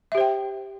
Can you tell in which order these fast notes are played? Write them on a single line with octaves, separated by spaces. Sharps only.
E5 G4 C5 G5